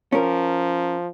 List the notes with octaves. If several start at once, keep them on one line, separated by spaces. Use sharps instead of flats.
F3 C#4 A#4